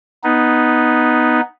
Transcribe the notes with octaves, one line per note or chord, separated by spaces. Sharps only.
B3 D#4